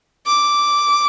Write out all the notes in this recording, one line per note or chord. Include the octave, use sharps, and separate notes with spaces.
D6